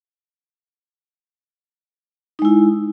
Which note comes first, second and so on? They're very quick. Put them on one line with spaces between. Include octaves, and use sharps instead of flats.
D#4 G#3 E4